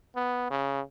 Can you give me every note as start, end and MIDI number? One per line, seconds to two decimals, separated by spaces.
0.16 0.46 59
0.50 0.81 49